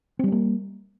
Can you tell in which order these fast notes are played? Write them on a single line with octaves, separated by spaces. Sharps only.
C4 G3 D4 A#3